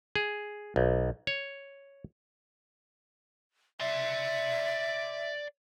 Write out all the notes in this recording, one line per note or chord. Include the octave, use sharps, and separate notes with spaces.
G#4
B1
C#5
D5 E5 C6